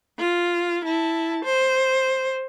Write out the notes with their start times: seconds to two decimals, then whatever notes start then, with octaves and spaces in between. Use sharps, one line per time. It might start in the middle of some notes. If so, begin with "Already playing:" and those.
0.19 F4
0.85 E4 A5
1.45 C5